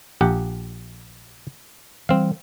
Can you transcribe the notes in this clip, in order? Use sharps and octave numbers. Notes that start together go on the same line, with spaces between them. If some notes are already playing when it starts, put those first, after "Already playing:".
A#1 G4 F#5
E3 G3 C4 F5